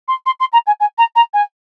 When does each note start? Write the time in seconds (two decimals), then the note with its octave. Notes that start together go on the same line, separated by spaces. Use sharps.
0.08 C6
0.26 C6
0.40 C6
0.53 A#5
0.67 G#5
0.80 G#5
0.98 A#5
1.16 A#5
1.34 G#5